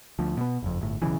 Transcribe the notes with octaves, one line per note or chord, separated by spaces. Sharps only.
D2 F3
B2 B3
F#1 F2
G1 A2
D1 B1 C#3 E3